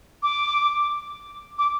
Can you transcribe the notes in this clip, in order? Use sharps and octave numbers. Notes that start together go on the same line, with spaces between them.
D6
D6